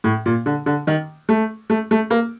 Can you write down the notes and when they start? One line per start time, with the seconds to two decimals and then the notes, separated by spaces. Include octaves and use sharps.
0.04 A2
0.26 A#2
0.46 D3
0.66 D3
0.87 D#3
1.29 A3
1.70 A3
1.91 A3
2.10 A#3